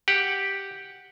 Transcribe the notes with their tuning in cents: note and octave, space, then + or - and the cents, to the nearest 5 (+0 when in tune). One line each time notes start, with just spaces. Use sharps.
G4 +0 F#5 +0